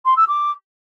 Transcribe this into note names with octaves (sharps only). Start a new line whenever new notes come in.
C6
E6
D6